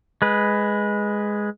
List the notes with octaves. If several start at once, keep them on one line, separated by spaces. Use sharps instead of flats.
G#3 B4